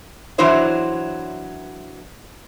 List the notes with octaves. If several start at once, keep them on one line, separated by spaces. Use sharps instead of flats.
E3 F#3 D4 E4 C5 C#5